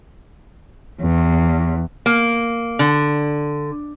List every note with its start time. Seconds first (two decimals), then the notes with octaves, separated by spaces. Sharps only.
1.02 E2
2.06 A#3
2.79 D3